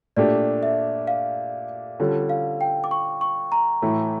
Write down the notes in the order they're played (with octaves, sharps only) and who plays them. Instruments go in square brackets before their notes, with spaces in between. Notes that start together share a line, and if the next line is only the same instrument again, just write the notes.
[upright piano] A#2 A3 D4 G4 [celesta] D5
[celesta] E5
F5
[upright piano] D3 G3 C#4 F4 A4
[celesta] F5
G5
D6
C#6
C#6
A#5
[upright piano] A2 E3 A3